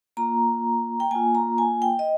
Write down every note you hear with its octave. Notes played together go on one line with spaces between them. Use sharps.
A#3 F4 A#5
G5
A#3 F4 G#5
A#5
G#5
G5
D#5